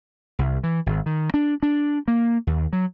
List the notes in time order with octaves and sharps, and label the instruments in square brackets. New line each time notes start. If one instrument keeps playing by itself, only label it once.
[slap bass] C2
E3
G#1
D#3
D4
D4
A#3
D#2
F#3